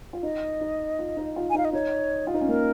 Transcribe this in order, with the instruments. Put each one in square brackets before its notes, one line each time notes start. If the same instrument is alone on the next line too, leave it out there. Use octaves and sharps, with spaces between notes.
[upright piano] F4
[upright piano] D#4 [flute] D#5
[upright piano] D#4
F4
D#4
F4
[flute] G#5
[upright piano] D#4
[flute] F5
D#5
[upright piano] D#4 [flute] C#5
[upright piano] F4
D#4
C#4
[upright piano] A#3 [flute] A#4